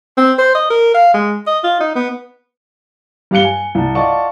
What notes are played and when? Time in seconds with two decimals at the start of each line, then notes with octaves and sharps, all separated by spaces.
0.18 C4
0.38 C5
0.55 D#5
0.70 A#4
0.94 F5
1.14 G#3
1.47 D#5
1.64 F4
1.80 D#4
1.95 B3
3.31 G2 G4 F5 F#6 C#7 G7
3.44 G#5
3.75 C2 A5
3.95 F4 D5 D#5 F#5 A5 C#6